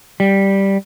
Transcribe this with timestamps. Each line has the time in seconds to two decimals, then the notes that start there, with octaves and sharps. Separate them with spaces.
0.20 G3